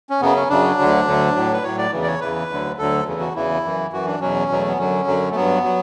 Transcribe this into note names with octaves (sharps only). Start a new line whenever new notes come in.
C#4
F#2 C#3 F#3 B3
C#4
F#2 C#3 F#3 D4
D2 D3 F#3
D2 D3 F#3
A2 F#3
B4
A2 F#3 C#5
D5
E2 C#3 E3
D5
C#5
E2 C#3 E3 B4
D2 D3 F#3
D2 D3 F#3 A4
E2 C#3 E3
F#4
E2 C#3 E3 E4
F#2 E3
F#2 E3 F#4
D4
E2 B2 F#3 C#4
E2 B2 F#3
A3
B3
F#2 D3 F#3 C#4
F#2 D3 F#3
A3
G2 F#3 B3
F#3